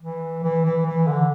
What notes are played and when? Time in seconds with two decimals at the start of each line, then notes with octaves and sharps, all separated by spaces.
0.02 E3
0.44 E3
0.65 E3
0.86 E3
1.07 D3